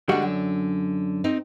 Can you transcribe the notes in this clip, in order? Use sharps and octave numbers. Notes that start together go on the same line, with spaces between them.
D3 G3 G#3 D4 F#4
F#2
C4 D#4